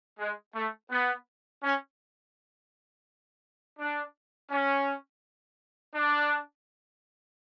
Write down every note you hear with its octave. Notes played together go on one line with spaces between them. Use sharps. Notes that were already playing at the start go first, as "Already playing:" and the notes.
G#3
A3
B3
C#4
D4
C#4
D4